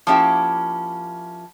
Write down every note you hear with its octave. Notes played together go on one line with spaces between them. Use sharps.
F3 A#3 C#4 E4 G4 E5